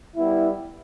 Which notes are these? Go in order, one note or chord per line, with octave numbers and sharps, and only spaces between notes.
G3 B3 E4